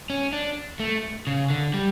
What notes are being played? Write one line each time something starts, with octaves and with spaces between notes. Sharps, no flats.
C#4
D4
A3
C#3
D3
G3